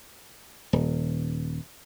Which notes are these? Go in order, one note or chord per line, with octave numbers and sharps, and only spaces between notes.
D#1